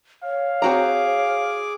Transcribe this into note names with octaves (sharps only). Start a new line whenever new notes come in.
C#5 F5
C4 F#4 G#4 A#5 D6